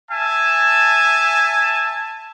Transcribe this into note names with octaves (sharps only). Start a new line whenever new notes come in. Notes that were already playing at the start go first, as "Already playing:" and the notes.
E5 G#5 A5